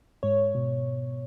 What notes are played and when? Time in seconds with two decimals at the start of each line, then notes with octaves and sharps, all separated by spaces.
0.23 G#2 C#5
0.55 B2